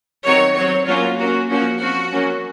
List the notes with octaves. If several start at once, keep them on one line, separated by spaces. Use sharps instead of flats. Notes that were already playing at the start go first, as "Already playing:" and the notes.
D#3 F#3 C4 C#5
F#3 C4 C#5
F#3 A#3 C#4 F4
F#3 A#3 C#4 F#4
F3 A#3 C#4 F#4
F3 C4 F#4
F#3 A#3 C#4